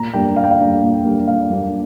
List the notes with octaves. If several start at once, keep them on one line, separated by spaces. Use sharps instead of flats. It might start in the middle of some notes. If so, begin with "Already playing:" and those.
Already playing: A#2 A#5
G3 A#3 D4 G5
A#2 F5
G5
F5
G3 A#3 D4
A#2
G3 A#3 D4
A#2 F5
G3 A#3 D4